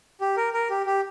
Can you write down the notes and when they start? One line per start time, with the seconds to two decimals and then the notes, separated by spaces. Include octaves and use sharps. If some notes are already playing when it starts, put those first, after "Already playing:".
0.21 G4
0.37 A#4
0.53 A#4
0.70 G4
0.86 G4